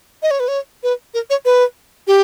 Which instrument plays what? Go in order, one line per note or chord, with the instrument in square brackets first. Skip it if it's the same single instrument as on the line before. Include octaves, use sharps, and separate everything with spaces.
[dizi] D#5
C#5
B4
C#5
B4
A#4
C#5
B4
G4